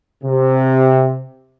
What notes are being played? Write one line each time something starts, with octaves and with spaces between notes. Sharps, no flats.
C3